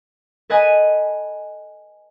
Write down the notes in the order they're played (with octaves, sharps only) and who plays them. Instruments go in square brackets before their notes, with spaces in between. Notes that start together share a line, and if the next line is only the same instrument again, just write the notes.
[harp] A4 B4 D#5 G#5